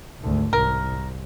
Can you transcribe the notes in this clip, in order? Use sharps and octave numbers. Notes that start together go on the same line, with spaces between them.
G#1 D2
C2 A#4